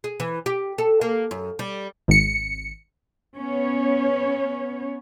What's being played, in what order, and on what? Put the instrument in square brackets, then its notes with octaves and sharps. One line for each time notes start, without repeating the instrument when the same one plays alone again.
[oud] G#4
E3
G4
A4
A#3
F#2
G3
[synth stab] G#1 C#7
[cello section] B3 C#4 C#5